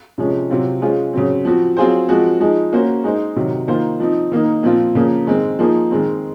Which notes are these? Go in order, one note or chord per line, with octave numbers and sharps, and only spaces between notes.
C3 F3 G#3 C#4
C3 F#3 C4 F4
G#3 C#4 F4 G#4 C5
C#3 F#3 C4
F3 C4 F#4
F#3 C4 F4 G#4 C5
F3 G#3 C4 F#4
F3 G#3 D#4
A#3 C#4 F#4 C5
G#3 D#4 G#4 C5
C3 D#3 F#3
D#3 A#3 F4 C5
F3 C4 D#4
D#3 A#3 D#4
A#2 F3 C4 F4
C#3 F3 A#3
D#3 G#3 C4
F3 A#3 D#4 G#4 C5
D#3 G#3 C4